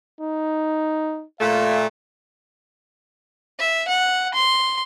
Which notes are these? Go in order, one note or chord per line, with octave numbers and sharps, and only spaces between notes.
D#4
A#2 A3 F5
E5
F#5
C6